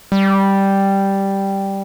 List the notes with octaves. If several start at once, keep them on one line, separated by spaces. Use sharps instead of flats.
G3